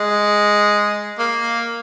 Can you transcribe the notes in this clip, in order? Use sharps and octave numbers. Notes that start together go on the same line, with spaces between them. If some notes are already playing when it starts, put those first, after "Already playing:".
Already playing: G#3
A#3